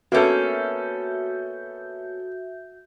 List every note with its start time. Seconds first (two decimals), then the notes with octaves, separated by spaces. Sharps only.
0.12 A#3 B3 C#4 F#4 A4 E5 G6